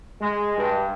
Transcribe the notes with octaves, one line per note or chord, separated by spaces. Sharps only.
G#3
G2